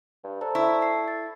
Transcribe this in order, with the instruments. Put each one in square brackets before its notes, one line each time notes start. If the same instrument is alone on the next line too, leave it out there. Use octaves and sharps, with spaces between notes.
[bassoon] G2
[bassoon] A4 [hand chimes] C5 D5 A#5
[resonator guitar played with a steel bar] E4 [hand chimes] C#6 E6
[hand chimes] C7
A6